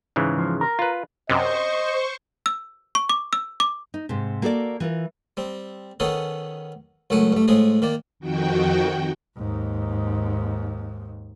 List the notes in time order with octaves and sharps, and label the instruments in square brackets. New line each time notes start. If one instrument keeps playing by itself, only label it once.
[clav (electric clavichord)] G#2 C#3 E3
[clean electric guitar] F3
A#4
[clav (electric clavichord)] F4 B4
[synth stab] F#2 C3 [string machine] C5 C#6 [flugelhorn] D#5
[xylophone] E6
C#6
D6
E6
D6
[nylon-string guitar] D#4
G#2 C3
A#3 F#4 A4 B4 D5
E3 F4 A#4
[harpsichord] G3 C4
D#3 B3 C#4 G#4 A4
C#2 F#2 A3 F#5 G#5
G2 A3
A2 F3 G#3 G#4
D#3 A#3 D5
[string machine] F2 D#3 F#4 G5
[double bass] D#2 G#2